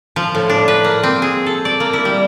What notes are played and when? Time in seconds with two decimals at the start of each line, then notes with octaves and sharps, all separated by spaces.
0.16 F3
0.35 A2
0.50 D4
0.68 B4
0.84 A#3
1.03 C4
1.22 G#4
1.46 A4
1.65 D5
1.80 A#3
1.93 E4
2.05 G3